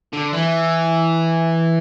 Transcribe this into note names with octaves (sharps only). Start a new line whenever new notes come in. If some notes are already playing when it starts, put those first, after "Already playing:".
D3
E3